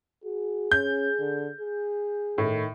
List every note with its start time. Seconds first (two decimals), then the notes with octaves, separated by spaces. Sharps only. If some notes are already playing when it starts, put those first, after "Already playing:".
0.24 F#4 G#4
0.72 C#4 G6
1.19 D3
1.61 G#4
2.38 A2 D#3